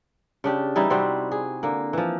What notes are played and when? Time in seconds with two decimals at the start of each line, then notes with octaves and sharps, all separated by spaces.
0.44 C#3 D4 G4
0.76 E3 G3 D#4 E4
0.90 C3 G3 C4 F#4
1.32 G#4
1.63 D3 A#3
1.93 E3 F3